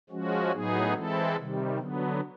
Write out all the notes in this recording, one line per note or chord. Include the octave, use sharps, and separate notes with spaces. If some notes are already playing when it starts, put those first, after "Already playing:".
F3 G#3 C#4 F#4
A2 F#3 B3 D#4 G#4
E3 G#3 C4 E4 A4
C3 D#3 G3
D3 F#3 B3